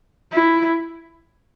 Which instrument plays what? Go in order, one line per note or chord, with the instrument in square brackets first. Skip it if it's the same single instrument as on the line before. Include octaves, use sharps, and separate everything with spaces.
[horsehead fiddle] E4